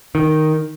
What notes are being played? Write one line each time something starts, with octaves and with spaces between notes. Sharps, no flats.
D#3